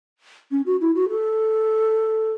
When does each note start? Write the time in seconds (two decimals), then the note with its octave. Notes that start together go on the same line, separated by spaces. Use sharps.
0.51 C#4
0.66 F#4
0.81 E4
0.95 F#4
1.10 A4